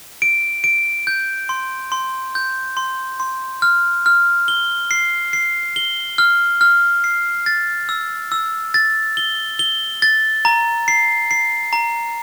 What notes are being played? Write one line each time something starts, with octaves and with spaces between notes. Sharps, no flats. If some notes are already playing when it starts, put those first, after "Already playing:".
D7
D7
G6
C6
C6
G6
C6
C6
F6
F6
G7
C7
C7
G7
F6
F6
C7
A6
E6
E6
A6
G7
G7
A6
A#5
C7
C7
A#5